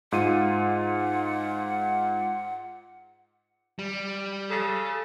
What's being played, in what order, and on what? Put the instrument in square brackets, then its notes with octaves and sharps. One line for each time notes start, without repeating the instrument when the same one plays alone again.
[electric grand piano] G#2 F4 D#7 [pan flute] F#5
[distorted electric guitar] G3
[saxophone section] C#3 A4